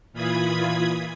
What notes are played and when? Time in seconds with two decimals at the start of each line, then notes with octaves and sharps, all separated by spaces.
0.13 A#2 E3 F4 B5 D#6 G#6